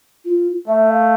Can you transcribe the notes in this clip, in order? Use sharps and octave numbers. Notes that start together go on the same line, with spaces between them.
F4
A3 E5
F5